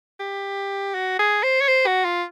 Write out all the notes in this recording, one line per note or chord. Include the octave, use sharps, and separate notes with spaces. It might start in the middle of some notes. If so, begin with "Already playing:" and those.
G4
F#4
G#4
C5
C#5
C5
F#4
F4